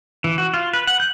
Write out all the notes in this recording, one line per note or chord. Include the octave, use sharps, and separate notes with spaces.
E3
F#4
F4
B4
F#5
G6